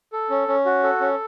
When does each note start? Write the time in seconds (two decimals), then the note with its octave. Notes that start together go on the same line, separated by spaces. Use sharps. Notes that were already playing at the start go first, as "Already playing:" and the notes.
0.13 A4
0.30 C#4
0.48 C#4
0.65 F#4
0.84 A4
1.00 C#4